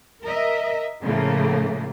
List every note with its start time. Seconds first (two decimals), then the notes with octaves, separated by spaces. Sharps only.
0.23 A#4 D#5 E5
1.02 A2 C#3 F3 A3 A#3